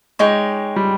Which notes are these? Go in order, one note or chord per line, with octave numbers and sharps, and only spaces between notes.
G#3 D#4 G4 C#5
G3